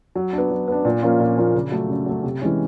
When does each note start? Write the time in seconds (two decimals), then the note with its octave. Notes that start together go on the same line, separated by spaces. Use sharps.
0.15 F#3
0.33 B3 D4
0.50 F#3
0.68 B3 D4
0.85 A#2
1.02 F3 A#3 C#4 F4
1.20 A#2
1.37 F3 A#3 C#4 F4
1.54 C#3
1.71 F#3 A3
1.89 C#3
2.06 F#3 A3
2.23 C3
2.41 E3 G#3 C#4